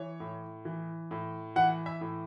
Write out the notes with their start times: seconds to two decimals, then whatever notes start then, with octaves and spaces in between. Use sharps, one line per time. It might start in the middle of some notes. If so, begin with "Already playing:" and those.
Already playing: E3 C#5
0.20 A2
0.65 E3
1.11 A2
1.56 E3 F#5
1.86 E5
2.01 A2